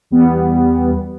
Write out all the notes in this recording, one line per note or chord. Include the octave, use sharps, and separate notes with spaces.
E2 G3 B3